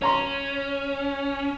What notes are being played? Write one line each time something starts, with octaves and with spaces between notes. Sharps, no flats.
C#4 C#5 A#5 C6